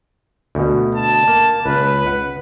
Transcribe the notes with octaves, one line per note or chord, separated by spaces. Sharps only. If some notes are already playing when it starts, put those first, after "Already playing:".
D2 B2
A5
A#3
C#2 B4 F5
F#5